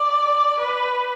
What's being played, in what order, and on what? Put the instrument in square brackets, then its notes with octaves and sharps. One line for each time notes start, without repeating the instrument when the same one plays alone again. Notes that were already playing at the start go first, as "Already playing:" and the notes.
Already playing: [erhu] D5
B4